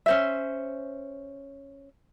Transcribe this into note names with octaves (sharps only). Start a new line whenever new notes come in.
C#4 C5 E5